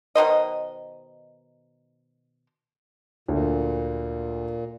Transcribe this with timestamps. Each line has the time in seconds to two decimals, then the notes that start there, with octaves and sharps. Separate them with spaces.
0.15 B2 D#3 C5 D#5
3.28 D2 A#2